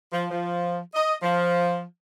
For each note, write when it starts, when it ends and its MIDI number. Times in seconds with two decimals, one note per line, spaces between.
0.12 0.25 53
0.30 0.79 53
0.94 1.15 75
1.22 1.82 53